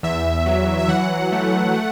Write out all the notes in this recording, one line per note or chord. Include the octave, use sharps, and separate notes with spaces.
E2 E5
F#3
E5
E3 F#5
A3
A3